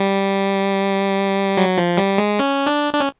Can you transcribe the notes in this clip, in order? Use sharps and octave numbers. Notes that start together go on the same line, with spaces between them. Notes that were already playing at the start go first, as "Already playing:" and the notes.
Already playing: G3
F#3
F3
G3
G#3
C#4
D4
D4
C#4